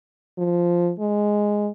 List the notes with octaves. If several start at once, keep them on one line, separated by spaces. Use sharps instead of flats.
F3
G#3